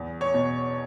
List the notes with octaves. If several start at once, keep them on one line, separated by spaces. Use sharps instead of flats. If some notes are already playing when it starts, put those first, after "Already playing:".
Already playing: E2
C#5
B2